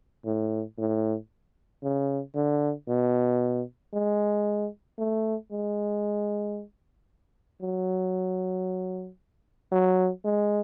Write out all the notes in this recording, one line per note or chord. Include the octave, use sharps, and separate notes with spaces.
A2
A2
C#3
D3
B2
G#3
A3
G#3
F#3
F#3
G#3